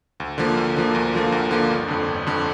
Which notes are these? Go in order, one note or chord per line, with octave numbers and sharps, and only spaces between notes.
D2
D3 F3 A#3
D2
D3 F3 A#3
D2
D3 F3 A#3
D2
D3 F3 A#3
G1
F2 D3
G1
F2 D3